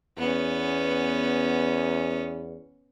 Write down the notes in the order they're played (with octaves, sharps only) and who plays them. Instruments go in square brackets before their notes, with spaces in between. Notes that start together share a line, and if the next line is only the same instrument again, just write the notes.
[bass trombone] E2 [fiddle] B3 C#4